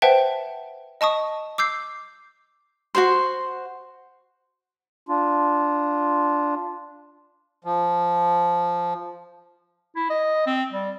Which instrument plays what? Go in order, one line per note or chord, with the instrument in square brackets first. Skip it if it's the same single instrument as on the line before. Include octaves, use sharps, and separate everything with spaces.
[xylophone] B4 C5 E5 F#5 G5 A5
D#5 A5 C#6 D#6
D6 E6 G6 C7
[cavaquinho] F#4 G#4 C5 C6
[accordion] D4 F4
F3
[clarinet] E4
D#5
C4
G3